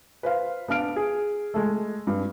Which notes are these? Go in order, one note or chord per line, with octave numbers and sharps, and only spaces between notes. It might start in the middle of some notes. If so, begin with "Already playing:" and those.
B4 C5 F5
B3 D4 F5 F6 D7
G#4
G#3 A3
G2